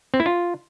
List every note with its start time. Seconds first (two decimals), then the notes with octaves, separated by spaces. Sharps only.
0.14 C4
0.20 E4
0.26 F4